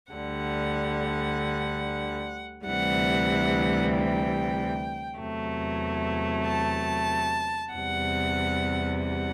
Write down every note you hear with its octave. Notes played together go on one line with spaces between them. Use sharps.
D2 D3 G3 F#5
D2 C3 E3 G3 F#5
G5
E2 C3 F#3 A3
A5
E2 C3 G3 F#5
F#5